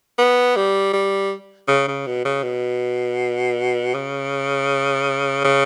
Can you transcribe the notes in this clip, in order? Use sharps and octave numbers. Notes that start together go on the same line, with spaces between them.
B3
G3
G3
C#3
C#3
B2
C#3
B2
C#3
C#3